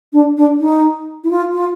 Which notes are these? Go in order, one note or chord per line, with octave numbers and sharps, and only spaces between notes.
D4
D4
D#4
E4
F4
F4